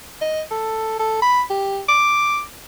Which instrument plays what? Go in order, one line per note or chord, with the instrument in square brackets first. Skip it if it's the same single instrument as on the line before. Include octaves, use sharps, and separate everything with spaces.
[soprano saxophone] D#5
A4
A4
B5
G4
D6